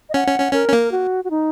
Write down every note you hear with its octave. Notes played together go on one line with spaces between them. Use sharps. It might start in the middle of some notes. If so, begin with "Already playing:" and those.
D#5
C#4 F#5
C#4
C#4
C#4 A#4
C#4
A#3
F#4
F#4
D#4